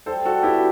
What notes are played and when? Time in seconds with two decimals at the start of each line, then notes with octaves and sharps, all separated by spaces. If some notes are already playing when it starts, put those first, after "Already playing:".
0.06 G3 A4 C5
0.25 G3 F#4 A4
0.43 B2 E4 G4